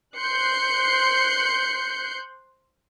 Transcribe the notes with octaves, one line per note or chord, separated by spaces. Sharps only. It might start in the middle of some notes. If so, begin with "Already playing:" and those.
C5 C6 F#6 G6 C7 C#7